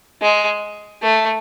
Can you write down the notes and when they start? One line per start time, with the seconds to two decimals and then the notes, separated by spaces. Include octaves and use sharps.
0.22 G#3
1.02 A3